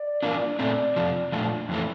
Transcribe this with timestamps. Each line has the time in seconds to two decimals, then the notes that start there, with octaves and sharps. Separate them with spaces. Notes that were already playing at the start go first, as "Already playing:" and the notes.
Already playing: D5
0.22 G2 E3 A#3 D4 F4 A#4
0.34 D5
0.47 D5
0.59 A#2 A3 C4 D5
0.96 F2 C3 F3
1.32 A#2 F3 A3 D4
1.69 F2 E3 A3